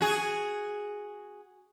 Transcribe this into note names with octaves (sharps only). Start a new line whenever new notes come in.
F#4 G#4